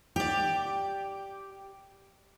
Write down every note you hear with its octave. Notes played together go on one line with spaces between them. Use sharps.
G4 D5